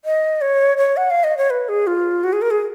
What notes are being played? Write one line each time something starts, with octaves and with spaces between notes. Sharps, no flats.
D#5
C#5
C#5
F#5
F5
D#5
C#5
B4
G#4
F4
F#4
G#4
A#4
G#4